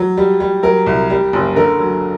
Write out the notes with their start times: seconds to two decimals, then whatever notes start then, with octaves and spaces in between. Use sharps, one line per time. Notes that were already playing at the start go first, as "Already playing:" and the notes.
Already playing: F#3
0.17 G3
0.40 G3
0.63 F#3 A#4
0.86 C2
1.10 G3
1.33 F#1
1.56 D3 A#4
1.79 F#3